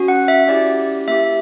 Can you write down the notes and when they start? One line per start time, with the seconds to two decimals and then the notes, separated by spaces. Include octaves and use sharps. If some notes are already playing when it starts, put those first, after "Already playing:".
Already playing: C#4 F#4
0.08 F#5
0.28 E5
0.48 C#4 E4 G4 D5
1.08 A#3 E4 G4 E5